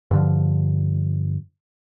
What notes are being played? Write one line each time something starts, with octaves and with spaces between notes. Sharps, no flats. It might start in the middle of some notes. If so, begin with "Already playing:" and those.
G2 D3 F3